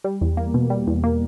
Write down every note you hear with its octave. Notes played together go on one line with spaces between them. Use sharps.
G3
E2
A#3
B2
G3
E2
A#3